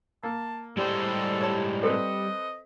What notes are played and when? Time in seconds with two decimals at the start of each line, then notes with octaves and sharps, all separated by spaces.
0.23 A#3 A5
0.77 A2 G3 G#3 A4 C5
1.41 C#5 A5
1.83 C4 A4 B4 D#5